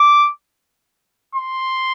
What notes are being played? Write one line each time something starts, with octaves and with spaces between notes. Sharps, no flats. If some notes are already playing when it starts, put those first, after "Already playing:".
Already playing: D6
C6